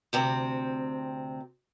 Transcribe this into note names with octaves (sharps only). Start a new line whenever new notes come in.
D2 C3 C4